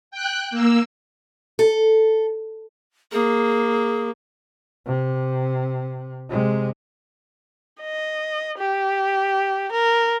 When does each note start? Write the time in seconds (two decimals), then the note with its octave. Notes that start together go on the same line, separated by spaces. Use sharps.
0.11 G5 F#6
0.51 A#3 E6
1.59 A4
3.12 A#3 G#4
4.86 C3
6.30 C3 G#3
7.81 D#5
8.58 G4
9.72 A#4